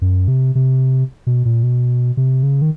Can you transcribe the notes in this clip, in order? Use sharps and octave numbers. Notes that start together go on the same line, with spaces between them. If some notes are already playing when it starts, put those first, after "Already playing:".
F#2
C3
C3
B2
A#2
B2
C3
C#3
D#3